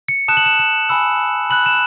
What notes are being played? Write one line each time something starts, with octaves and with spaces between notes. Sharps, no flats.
C#7
A5 D#6 F#6 E7
F#7
E7
E7
G#5 B5 E6
B5 F#6 F#7
E7